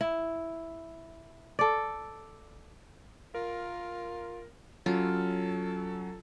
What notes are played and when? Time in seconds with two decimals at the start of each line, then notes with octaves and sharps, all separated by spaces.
0.01 E4
1.59 A4 D5
3.35 F4 A#4
4.86 F#3 C#4 F4 A4